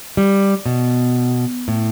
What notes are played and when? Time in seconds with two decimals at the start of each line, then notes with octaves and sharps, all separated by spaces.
0.17 G3
0.66 B2
1.68 A2